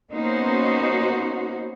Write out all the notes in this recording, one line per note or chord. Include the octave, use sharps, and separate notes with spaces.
A#3 B3 C#4 D#4 F#4 C5